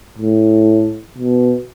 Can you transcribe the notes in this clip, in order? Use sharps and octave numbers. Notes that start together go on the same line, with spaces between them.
A2
B2